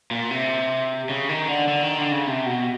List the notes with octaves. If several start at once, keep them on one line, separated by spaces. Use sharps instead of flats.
A#2
C3
C#3
D#3
D3
D3
D#3
D3
C#3
C3
B2